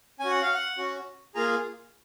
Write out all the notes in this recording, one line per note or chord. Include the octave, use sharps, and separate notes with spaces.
C#4 F#4 G#5
F#5
F5
F#5
C#4 F#4
A#3 F4 G#4 A#5